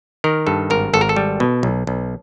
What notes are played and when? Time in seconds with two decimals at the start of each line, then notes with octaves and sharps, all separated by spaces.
0.24 D#3 A#4
0.47 G2 A4
0.70 G#1 A#4
0.93 G#1 A4
1.01 A#4
1.09 A4
1.16 G3
1.40 B2
1.63 B1
1.87 B1